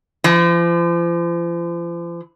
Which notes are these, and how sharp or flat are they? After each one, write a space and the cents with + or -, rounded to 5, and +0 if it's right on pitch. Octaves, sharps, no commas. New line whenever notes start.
F3 -40